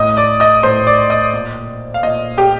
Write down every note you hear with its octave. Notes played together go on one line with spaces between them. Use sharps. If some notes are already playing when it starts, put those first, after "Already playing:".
Already playing: A2 D#5 D#6
D5 D6
D#5 D#6
A2 C5 C6
D5 D6
D#5 D#6
A#2
F5
A#2 D#5
G4 G5